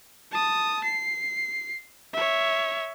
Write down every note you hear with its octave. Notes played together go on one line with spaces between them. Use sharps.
A5 D#6
C7
C#5 E5